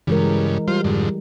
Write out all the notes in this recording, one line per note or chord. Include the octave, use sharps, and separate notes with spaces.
G2 C#3 E3 G#3 A#4
G3 F4 C5
F2 G#2 D3